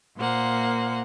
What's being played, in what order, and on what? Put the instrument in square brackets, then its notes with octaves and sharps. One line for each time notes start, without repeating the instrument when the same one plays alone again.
[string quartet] A#2 A#3 C5 F#5